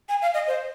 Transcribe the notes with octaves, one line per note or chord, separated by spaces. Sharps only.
G#5
F5
D#5
C5